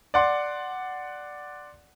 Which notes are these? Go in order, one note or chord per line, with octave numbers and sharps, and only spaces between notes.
D5 F#5 C6